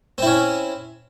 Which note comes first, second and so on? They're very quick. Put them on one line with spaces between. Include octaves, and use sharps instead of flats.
C4 E4 C#4